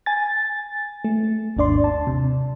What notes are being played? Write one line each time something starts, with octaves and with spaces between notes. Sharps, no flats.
G#5 A6
A3
G#1 D#2 D4 D5 C6
A5
C3